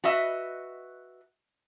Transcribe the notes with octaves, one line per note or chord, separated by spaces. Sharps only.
F#4 B4 D#5 E5